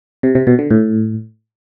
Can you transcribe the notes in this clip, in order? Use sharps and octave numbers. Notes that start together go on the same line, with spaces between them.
C3
C3
B2
D3
A2